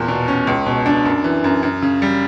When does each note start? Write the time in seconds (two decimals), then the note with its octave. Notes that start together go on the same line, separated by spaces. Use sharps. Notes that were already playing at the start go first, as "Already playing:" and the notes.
Already playing: E2 A#2
0.08 B2
0.28 C#4
0.47 C#2
0.66 B2
0.86 D4
1.05 F#2
1.24 E3
1.44 F#2
1.63 F#2
1.82 C#3
2.02 G3